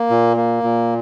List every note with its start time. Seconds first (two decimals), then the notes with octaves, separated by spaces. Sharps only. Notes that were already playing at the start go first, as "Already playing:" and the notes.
Already playing: A#3
0.10 A#2
0.37 A#3
0.63 A#2